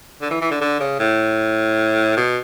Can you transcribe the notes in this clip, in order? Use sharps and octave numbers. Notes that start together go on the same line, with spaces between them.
D3
E3
E3
D3
D3
C#3
A2
B2